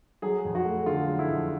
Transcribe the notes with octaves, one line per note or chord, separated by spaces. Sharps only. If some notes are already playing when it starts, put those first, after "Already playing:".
F#3 G#4
F2
F#4
A3
D3 F4
F#3
E4
F2